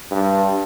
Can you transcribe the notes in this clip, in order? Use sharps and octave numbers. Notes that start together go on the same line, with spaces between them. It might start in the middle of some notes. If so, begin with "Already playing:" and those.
G2